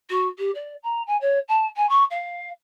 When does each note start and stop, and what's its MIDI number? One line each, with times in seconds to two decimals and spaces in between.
0.09 0.27 66
0.38 0.50 67
0.54 0.74 74
0.83 1.01 82
1.06 1.17 80
1.20 1.38 73
1.48 1.66 81
1.76 1.88 80
1.89 2.04 85
2.10 2.49 77